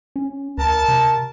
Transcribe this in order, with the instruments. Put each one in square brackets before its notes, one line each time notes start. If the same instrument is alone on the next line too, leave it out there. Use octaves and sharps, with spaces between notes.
[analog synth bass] C#4
[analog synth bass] D2 [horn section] A#4 A5
[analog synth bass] C3